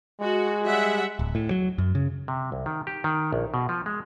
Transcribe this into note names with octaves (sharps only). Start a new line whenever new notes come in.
G#3 F#4
G3 E5 F#5
D1
A2
F#3
F#2
C#3
C3
C2
D#3
G4
D#3
A#1
B2
F3
G#3